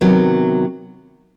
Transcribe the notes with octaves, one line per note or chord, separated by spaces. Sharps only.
C3 D#3 F#3 B3